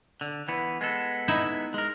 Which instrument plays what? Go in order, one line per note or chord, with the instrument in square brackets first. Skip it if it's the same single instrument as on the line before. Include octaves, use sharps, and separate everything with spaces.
[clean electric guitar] D3
E3 B3
G#3 B3 A4
[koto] D#4 E4 E5
[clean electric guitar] G#3 A#4